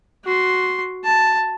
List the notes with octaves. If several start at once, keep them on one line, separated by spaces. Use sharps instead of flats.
F#4 C6
A5